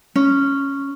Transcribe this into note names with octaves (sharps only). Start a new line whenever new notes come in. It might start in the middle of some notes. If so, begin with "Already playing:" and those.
C#4